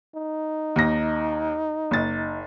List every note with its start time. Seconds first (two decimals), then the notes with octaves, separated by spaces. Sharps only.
0.15 D#4
0.76 D#2 A#6
1.91 F#1 A6